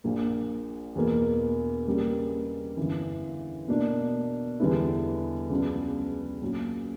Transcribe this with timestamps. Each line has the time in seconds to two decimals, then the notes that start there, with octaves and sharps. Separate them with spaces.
0.04 A#1 A#2 A#3
0.95 E2 B2 A#3
1.87 C#3 G3 A#3
2.77 G1 F#2 E3
3.68 B2 A#3 D4
4.60 E2 D3 G3 B3 E4
5.50 C#2 C#3 F#3 B3 D4
6.42 A#2 F#3 C#4